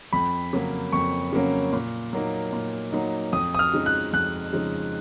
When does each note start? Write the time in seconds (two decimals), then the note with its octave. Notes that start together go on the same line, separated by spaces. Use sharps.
0.13 F2 B5
0.53 C#3 F#3 A#3 C#4
0.92 F2 C#6
1.33 C#3 F#3 A#3 C#4
1.72 A#2
2.13 F#3 A#3 D#4
2.52 A#2
2.92 F#3 A#3 D#4
3.33 F2 D#6
3.55 D#6
3.59 F6
3.73 C#3 F3 G#3 D#4
3.86 F#6
4.13 F2 F#6
4.53 C#3 F3 G#3 D#4